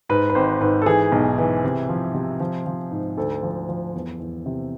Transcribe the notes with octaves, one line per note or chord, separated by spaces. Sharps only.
G#2 B4
B4
G#1 C5
G#2 B4
A4
E3 G#4
B1
E3
C3
F3
C3
F3
F3
G#2
D2 A4
F3
F3
E2
E2
C3